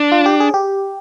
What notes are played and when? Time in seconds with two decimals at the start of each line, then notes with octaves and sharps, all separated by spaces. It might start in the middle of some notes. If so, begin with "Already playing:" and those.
Already playing: D4
0.12 F4
0.26 G4
0.40 G#4
0.54 G4